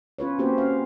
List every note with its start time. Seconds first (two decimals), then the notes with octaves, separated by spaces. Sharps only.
0.18 C#4 F4 B4 C#5
0.39 A#3 C4 C#4 F#4 G4 C5
0.58 C#4 F5